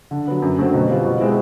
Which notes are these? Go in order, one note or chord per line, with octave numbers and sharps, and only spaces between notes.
D3
F#3 B3
F#2
D3 F#3 A3 C4
B2
G3 C4 F4
B2
G#3 C4 E4